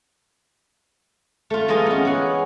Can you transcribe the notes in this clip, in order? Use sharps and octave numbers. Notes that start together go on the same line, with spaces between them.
A3 F4
E3 G#3 D#4 F4 D#5 G#5
B3 C#4
G#4 F#5